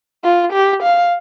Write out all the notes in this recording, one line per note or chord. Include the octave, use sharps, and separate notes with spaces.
F4
G4
F5